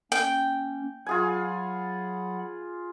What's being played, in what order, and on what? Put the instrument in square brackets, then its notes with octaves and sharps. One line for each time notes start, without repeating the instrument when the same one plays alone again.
[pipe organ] A#3 C#4 [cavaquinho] G5
[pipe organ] F#3 F#5 B5 [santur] F4 G#4 G#5